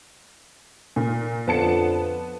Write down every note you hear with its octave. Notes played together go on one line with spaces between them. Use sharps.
A#2
F2 D3 F3 B3 A5 C#7